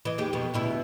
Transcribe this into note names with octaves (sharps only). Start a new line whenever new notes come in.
E3 D#5
D#2 G#3 G4
F2 B2
D2 B2 E4